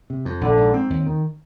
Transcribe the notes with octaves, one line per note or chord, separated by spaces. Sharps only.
C3
F2
A#1 D3
G#2
C4
D#2
D#3